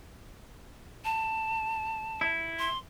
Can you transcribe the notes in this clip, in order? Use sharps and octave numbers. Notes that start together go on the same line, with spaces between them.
A5
E4
C6